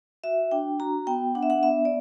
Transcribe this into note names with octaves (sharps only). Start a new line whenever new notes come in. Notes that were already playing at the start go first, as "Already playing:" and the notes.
F#4 E5
D4 G5
F#4 A#5
B3 G5
D4 F#5
E5
F#5
B3 E5
D5